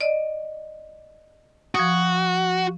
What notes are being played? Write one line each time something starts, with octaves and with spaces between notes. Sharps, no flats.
D5 D#5
F3 F#4 D#6